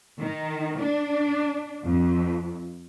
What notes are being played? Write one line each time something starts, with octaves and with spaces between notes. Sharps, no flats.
D#3
D4
F2